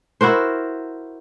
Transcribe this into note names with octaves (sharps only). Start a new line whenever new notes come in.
E4 F#4 A#4 C5